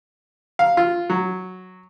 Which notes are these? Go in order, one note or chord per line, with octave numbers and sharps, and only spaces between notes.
F5
F4
F#3